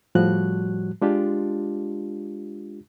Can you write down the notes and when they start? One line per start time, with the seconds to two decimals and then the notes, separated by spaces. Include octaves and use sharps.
0.15 A2 F3 G3 F#4 F#6
1.02 G#3 D4 F4 G4